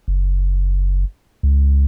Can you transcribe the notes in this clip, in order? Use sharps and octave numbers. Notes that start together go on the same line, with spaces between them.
F#1
C#2